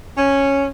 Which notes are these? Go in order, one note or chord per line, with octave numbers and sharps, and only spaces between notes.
C#4